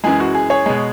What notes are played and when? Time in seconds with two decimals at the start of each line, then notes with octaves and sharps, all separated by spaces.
0.04 F#2 E3 G#3 G#4
0.20 F#4
0.35 G#4
0.50 G#4 C#5
0.66 B2 G#3